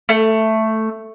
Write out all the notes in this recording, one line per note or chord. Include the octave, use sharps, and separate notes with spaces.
A3